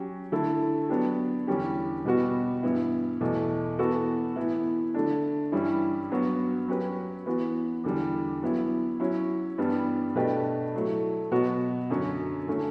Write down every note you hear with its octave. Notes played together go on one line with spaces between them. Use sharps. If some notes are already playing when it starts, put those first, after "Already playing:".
Already playing: F#3 C#4 G4
D3 A3 E4 A4
F#3 B3 D4 G4
E2 D3 G3 C#4 G4
B2 G3 B3 F#4
G2 E3 B3 E4
E2 B2 A3
E3 B3 F#4 A4
A2 E3 B3 E4
D3 A3 D4
G2 E3 G3 C#4 E4
G2 F#3 B3 F#4
F#3 C#4 G4 B4
E3 B3 F#4
E2 D3 G3
F#3 B3 E4
F#3 C#4 E4
G2 E3 G3 B3 D4
B2 A3 D4 G4 B4
A2 F#3 A3
B2 F#3 B3 F#4
F#2 D3 F#3 C#4
D3 A3 C#4